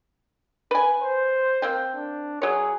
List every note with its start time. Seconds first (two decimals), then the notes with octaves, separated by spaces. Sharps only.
0.71 B4 G#5
1.02 C5
1.62 A#3 C4 G5
1.95 D4
2.42 F#3 G#4 C#5